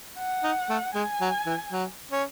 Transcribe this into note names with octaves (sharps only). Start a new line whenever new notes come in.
F#5
D#4
A3
G#3 G#5
F#3
E3
F#3
C#4